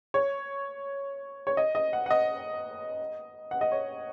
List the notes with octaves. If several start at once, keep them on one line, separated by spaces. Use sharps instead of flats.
C#5
C#5
D#5
D#5
F#5
F#5
D#5
F#5
D#5
C#5